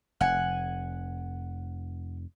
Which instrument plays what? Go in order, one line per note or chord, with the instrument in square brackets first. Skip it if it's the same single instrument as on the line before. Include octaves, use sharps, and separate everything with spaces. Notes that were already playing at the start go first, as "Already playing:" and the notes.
[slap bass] F1 [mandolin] F#5 G#5